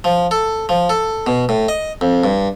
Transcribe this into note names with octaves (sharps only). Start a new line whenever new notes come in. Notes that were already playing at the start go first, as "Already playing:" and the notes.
F3
A4
F3
A4
B2
A2
D#5
F2
G2